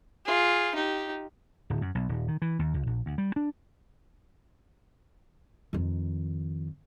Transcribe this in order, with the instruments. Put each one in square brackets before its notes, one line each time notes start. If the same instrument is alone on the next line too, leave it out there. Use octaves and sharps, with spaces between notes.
[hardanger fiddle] F4 G#4
D#4 G4
[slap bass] D1
F#2
B1
D#1
D#3
E3
D#2
C#2
A#1
D2
G3
D4
[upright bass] F2 D#3